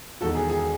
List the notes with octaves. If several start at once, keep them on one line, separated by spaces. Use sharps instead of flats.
E1 E2 D#3 F#4 A4
G#4
G#4